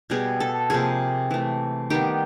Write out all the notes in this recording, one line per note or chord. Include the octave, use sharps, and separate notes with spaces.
B2 G3 B3 G#4
A4
C3 F3 A#3 G#4
E3 A3
D#3 G3 B3 G4